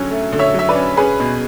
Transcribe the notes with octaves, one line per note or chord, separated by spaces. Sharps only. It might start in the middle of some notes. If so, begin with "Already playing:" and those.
Already playing: D3 F#3 C#4
A3
D3
C#5 E5
F#3 E5
B4 D5
C#4
C#4 G#4 B4
B2